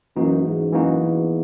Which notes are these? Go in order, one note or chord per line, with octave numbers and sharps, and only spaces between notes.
F#2 E3 A#3 D#4 F#4
G#2
F#2 E3 A#3 D#4 F#4
E2